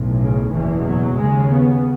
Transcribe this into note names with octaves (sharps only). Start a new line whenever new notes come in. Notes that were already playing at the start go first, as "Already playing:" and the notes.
Already playing: B1 A2
C#3
F#1 E2 B2 E3
F#3
D#2 C#3 G#3
B3